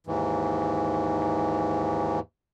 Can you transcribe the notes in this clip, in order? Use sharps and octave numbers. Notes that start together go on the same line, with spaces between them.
D#2 G#2 E3